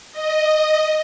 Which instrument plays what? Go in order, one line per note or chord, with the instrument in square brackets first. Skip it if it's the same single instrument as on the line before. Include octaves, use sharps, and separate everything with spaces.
[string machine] D#5